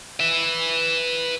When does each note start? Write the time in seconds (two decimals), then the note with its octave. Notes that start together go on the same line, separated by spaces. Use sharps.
0.20 B4 E5